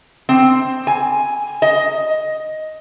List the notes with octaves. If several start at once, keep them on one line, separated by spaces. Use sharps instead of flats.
C4
G#5
D#5